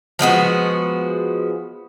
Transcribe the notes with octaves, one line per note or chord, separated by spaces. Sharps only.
F3 G#3 B3 F#4